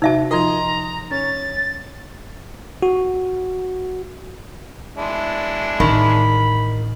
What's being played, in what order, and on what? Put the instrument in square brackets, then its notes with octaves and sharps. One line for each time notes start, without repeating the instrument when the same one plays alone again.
[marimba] C3 F#4 [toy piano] D#4 E5 A5
[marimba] F3 F4 A#4 [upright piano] D#5 C6 [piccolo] A#5
[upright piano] C#4 [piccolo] A6
[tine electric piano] F#4
[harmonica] G#3 D4 E4
[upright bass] A1 [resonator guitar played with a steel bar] D#3 [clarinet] B5